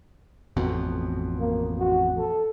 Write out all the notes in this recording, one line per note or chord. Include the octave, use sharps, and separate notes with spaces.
A1 F2 B2
A#3
F#4
A4